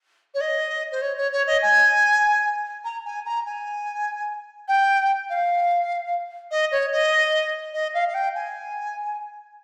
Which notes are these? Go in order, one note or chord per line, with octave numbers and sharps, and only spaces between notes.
C#5
D#5
C5
C#5
C#5
C#5
D#5
G#5
A#5
G#5
A#5
G#5
G5
F5
D#5
C#5
D#5
D#5
F5
F5
G5
G#5